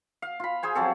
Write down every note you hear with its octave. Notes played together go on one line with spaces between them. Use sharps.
F5
F4 B5
G#4 C5 G#5
F3 F#3 C4 A4